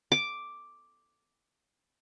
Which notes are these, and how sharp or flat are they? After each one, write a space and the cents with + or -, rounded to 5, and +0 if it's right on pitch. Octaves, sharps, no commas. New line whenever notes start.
D6 +0